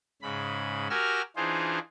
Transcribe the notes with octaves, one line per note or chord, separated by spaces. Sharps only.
G#2 C#3 B5
F#4 G4 A#4 G#5 E6 F6
E3 D4 D#4 F4 G#4 C5